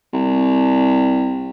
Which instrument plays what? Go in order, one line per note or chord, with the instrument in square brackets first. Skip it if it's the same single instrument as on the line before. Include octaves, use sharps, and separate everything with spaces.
[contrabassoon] C2